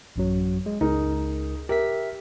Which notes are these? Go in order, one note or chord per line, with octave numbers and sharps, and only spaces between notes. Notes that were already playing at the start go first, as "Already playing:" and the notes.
A1 F#2 F#3
G#3
C#2 D#4 G#4 A#4
G4 A#4 E5 B6